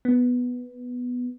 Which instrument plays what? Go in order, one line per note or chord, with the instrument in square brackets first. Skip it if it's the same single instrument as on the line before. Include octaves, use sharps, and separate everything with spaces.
[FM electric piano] B3